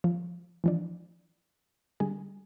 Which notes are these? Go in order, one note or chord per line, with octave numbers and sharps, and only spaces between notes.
F3
E3 F3 D4
D3 G3 G#4